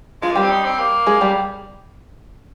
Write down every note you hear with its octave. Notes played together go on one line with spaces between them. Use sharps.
F3 G#3 F4
A#3
G3 G4
C4
D#4
C4
A#3
G#3 G#4
G3 G4